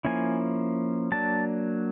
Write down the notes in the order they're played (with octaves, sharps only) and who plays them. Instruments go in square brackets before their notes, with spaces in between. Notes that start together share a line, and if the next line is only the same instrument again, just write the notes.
[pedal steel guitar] F3 A#3 C#4 E4 G#5
F#3 A#3 D4 A5